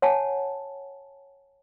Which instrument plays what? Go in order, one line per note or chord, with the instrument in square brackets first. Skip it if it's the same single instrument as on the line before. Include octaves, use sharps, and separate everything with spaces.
[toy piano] C#5 F#5 G#5 A5